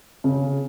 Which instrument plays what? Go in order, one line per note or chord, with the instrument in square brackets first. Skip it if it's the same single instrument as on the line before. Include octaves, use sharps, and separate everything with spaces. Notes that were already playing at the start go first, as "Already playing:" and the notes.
[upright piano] C#3